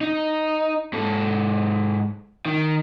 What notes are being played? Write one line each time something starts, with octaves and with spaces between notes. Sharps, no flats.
D#4
G#2 A4
D#3